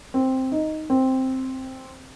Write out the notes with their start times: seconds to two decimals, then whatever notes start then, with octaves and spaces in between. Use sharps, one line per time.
0.14 C4
0.52 D#4
0.90 C4